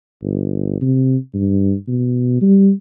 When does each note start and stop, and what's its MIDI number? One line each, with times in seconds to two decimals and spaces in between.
0.22 0.77 31
0.81 1.16 48
1.34 1.74 43
1.88 2.37 47
2.41 2.71 55